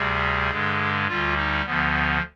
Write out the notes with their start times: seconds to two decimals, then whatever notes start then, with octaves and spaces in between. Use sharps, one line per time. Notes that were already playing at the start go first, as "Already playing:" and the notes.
Already playing: D2 C3 G3 G#4
0.50 G2 D3 G#3
1.08 D2 D3 G3 F4
1.36 D#4
1.65 D2 D3 F3 B3